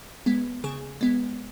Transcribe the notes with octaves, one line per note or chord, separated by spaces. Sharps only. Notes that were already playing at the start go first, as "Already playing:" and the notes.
G#3 B3
C#3 G#4
G#3 B3